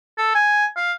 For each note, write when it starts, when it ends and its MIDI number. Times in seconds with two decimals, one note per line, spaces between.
0.18 0.33 69
0.35 0.66 80
0.77 0.93 77